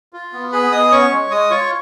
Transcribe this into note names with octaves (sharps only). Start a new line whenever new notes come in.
F4
B3
G#4 B4 B5
B3 D#5 D#6
C#4 C#5 C#6
G#3
G#3 D#5 D#6
F4 C#5 C#6